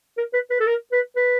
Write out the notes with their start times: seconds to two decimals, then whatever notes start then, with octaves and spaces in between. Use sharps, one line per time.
0.17 A#4
0.34 B4
0.50 B4
0.60 A4
0.67 A#4
0.92 B4
1.16 B4